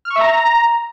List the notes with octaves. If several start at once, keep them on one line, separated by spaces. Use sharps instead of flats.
F6
C#6
E5
A#5